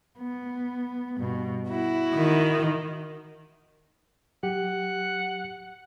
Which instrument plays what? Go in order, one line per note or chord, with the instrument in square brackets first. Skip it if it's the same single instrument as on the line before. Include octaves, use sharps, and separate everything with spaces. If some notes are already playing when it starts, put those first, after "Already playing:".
[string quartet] B3
G2 B2
E4 F#4
[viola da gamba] D#3
[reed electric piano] F#3 G4 [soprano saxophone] F#5